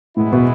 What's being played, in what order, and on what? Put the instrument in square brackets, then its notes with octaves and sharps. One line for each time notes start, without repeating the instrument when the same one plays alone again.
[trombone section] F#2 E3 G#3 B3 E4 [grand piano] A2
[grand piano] B2